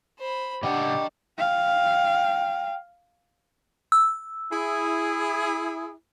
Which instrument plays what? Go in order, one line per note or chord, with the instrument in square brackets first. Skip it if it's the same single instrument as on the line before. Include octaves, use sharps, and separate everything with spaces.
[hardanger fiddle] C5 B5
[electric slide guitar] A2 C#3 F#5 [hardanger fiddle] D4 [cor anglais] G4 [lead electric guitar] D#5 G5
[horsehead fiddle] F5 [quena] G5
[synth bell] E6
[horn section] E4 G#4